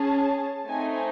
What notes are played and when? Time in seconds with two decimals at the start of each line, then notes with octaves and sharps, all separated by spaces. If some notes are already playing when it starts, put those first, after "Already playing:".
Already playing: C#4 G#4 A5
0.67 A3 C4 D#4 G#5